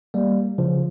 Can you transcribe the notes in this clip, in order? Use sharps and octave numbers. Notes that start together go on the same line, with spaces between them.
G3 A#3
C#3 F3